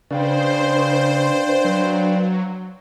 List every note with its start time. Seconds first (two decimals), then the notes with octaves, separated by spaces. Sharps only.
0.11 C#3 D4 B4 C5 D5 F5 G5
1.65 F#3